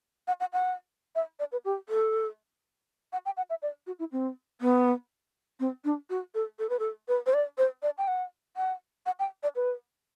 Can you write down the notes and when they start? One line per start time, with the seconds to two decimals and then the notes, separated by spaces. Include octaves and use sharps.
0.28 F#5
0.40 F#5
0.53 F#5
1.15 E5
1.39 D5
1.52 B4
1.65 G4
1.89 A4
3.13 F#5
3.26 G5
3.37 F#5
3.50 E5
3.62 D5
3.87 F#4
3.99 E4
4.12 C4
4.61 B3
5.60 C4
5.84 D4
6.10 F#4
6.34 A4
6.59 A4
6.69 B4
6.79 A4
7.08 B4
7.26 C5
7.34 D5
7.58 C5
7.83 D5
7.98 G5
8.08 F#5
8.57 F#5
9.06 F#5
9.19 G5
9.43 D5
9.56 B4